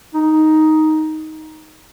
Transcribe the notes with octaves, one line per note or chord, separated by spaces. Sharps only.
D#4